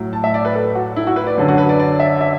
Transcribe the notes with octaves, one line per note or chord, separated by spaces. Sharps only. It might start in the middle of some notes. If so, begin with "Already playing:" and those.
Already playing: A2 F#3
A5
E5
D5
B4
A4
F#4
E4
F#4
B4
D5
F#2 D3 F#3
F#4
B4
D5
D5
E5
E5